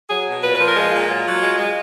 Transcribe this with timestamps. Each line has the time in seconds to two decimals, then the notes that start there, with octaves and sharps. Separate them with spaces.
0.09 F#3 G#4
0.26 B2
0.43 A#2 B4
0.55 F3 B4
0.68 A#4
0.76 G#3 F4
0.92 A#2 F4
1.10 F#3
1.25 F#3
1.43 G#3
1.58 G#3